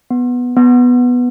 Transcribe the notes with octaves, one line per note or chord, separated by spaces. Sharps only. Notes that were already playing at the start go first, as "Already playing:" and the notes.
B3
B3